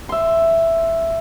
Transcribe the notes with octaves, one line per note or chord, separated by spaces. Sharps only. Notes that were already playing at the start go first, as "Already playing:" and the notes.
E5 C6